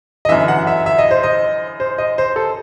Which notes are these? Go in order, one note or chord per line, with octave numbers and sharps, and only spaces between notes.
D#5
G1 F#2 E3 E5
F#5
E5
E5
D#5
C5
D#5
C5
D#5
C5
A4